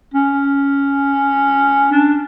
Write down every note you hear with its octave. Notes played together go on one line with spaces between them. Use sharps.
C#4
D4